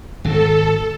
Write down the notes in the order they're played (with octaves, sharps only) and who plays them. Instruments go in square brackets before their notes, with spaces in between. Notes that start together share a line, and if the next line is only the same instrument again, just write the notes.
[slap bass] G#1 B2 [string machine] A4